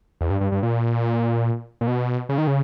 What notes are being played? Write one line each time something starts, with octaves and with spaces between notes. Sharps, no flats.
E2
G2
G2
G2
A#2
A#2
B2
C#3
D#3
C#3